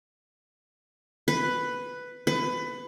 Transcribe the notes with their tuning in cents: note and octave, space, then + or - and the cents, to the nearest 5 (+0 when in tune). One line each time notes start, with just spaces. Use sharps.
B4 +5
B4 +20